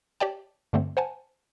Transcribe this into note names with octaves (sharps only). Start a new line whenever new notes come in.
G4 C#5 D5 G5 A5
G2 D3 A3 C4
C5 F#5 G#5 A5